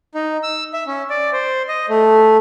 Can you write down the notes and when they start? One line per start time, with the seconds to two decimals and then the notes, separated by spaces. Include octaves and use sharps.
0.14 D#4
0.43 E6
0.73 E5
0.87 C#4
1.10 D5
1.33 C5
1.68 D#5
1.89 A3